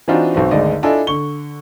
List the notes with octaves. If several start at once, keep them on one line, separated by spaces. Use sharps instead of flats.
E3 C4 D4 D#4 F4 F#4
B1 C4 F#4
G#1 D2 G#3 D5 D#5
D4 E4 F4 A4 D#5 G#5
D3 C#6 G7